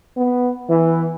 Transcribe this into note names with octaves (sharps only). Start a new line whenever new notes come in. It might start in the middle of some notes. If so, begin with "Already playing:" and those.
B3
E3